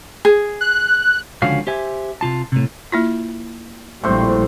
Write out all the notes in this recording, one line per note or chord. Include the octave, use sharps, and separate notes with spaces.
G#4
F#6
C#2 D3 F3 C#4 F#4 F5
G4 C5 E5 G#5
C3 F4 A5
A2 C3
A#3 E4 F4
A#1 A2 G3 C4 C5 C#6